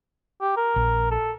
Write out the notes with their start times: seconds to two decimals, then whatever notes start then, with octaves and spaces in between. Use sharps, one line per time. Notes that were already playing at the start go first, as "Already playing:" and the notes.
0.41 G4
0.57 A#4
0.76 A#1
1.11 A4